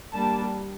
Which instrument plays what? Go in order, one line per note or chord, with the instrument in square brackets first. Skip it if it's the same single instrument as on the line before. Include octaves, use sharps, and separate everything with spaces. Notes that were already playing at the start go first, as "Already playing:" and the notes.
[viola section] G3 A#3 D4 A5